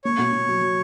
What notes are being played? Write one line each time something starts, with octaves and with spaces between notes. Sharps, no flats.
A#3 C#5
B2
B2
F#3
F#3